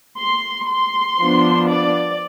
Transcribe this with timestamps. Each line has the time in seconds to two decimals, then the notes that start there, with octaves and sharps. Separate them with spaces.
0.18 C6
0.69 C6
1.20 F3 B3 D4
1.70 D5